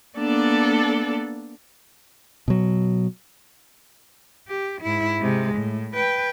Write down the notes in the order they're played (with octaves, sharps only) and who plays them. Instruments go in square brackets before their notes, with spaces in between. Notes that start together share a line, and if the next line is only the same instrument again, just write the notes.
[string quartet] A#3 B3 D4 A4 D5
[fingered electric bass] B2 F#3
[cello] G4
G#2 E4
C3 G#3
A2
B4 G5